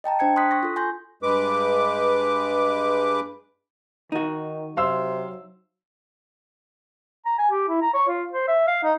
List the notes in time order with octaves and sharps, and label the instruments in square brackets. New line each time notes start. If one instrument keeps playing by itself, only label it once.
[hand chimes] D#5 G5 A5 A#5
D4 C5 G5 G#6 C#7
C6 D#6 F#6 B6
C#6 A#6
F4 A4
G#5 C6 G6 A#6
[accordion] G2 G#3 B4 D6
[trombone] D#3 [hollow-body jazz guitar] D#4 F#4
[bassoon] C3 [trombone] F#3 [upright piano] F5 C6 E6
[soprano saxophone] A#5
G#5
G4
E4
A#5
C#5
F4
C5
E5
F5
D#4